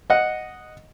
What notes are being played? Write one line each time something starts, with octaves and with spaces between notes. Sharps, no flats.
D#5 F#5